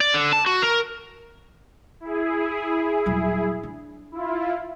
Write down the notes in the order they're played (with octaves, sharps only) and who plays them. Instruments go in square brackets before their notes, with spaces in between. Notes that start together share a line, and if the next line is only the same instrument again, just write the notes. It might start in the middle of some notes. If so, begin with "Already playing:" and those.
[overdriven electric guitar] D5
D3
A5
F#4
A#4
[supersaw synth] E4 G#4
[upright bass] D#1 F#3
D4
[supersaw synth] E4 F4